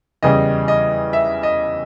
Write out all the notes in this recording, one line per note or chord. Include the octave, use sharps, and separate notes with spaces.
E2 C#3 E3 G3 D#5
D#5
E5
D#5